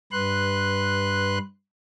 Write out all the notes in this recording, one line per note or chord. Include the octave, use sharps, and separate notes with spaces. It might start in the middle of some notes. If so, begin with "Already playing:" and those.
G2 B4 C6 F#6